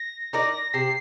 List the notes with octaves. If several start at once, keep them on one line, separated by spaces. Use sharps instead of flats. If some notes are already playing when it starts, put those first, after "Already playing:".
Already playing: A#6
D#4 A#4 D5 A#6
C3 C7